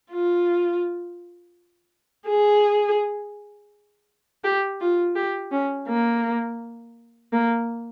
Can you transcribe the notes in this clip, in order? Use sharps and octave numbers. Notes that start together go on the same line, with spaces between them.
F4
G#4
G4
F4
G4
C#4
A#3
A#3